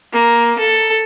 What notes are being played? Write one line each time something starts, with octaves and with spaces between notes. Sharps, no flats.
A#3
A4